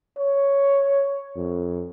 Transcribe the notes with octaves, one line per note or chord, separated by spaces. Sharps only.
C#5
F2